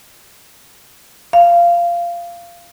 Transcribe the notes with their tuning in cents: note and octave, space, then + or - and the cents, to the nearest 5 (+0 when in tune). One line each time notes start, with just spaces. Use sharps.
F5 -15